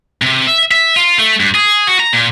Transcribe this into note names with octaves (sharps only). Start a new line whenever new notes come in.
C3
E5
E5
F4
A3
G2
G#4
F#4
A#5
A#2